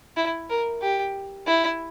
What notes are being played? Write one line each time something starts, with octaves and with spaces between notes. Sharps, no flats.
E4
A#4
G4
E4